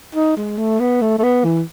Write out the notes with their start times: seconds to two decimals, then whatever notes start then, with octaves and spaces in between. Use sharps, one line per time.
0.15 D#4
0.37 G#3
0.58 A3
0.80 B3
1.02 A3
1.18 A3
1.23 B3
1.44 E3